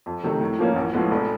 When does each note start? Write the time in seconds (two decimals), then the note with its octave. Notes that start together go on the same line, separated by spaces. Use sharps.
0.06 F2
0.23 C3 D#3 F#3 A3
0.41 A2
0.59 F3 A#3 C#4
0.76 A1
0.93 A2 F3 G#3 B3
1.11 F1